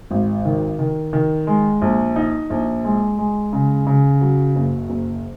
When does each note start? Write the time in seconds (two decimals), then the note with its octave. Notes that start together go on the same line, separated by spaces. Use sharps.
0.11 G#1
0.45 D#3
0.79 D#3
1.13 D#3
1.47 G#3
1.82 A#1
2.16 D#4
2.50 A#1
2.84 G#3
3.18 G#3
3.53 C#3
3.87 C#3
4.21 F#3
4.56 F#1
4.90 F#1